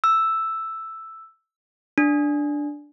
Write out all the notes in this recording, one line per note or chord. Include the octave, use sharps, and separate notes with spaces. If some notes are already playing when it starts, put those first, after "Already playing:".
E6
D4